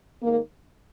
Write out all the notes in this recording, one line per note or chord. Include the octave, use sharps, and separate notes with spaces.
G#2 D#3 A#3